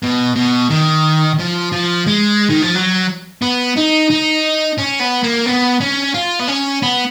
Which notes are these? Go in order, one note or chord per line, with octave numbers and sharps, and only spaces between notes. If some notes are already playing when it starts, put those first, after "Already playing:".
B2
B2
D#3
F3
F3
G#3
D#3
F3
F#3
B3
D#4
D#4
C#4
B3
A#3
B3
C#4
F4
B3
C#4
B3